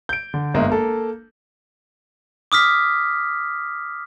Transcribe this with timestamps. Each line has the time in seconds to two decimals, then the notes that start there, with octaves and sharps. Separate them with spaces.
0.09 G6 D7
0.34 D3
0.54 G1 G#2 G#3 A#3 E5
0.70 A#3 A4
2.52 D6 D#6 F6 B6